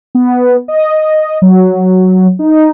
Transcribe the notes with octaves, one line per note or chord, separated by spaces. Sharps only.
B3
D#5
F#3
D#4